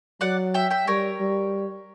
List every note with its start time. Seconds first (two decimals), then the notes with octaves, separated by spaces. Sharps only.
0.21 F#3 D5 F#5
0.54 E5 G5
0.70 E5 G5
0.87 G3 A#4 C#5
1.20 G3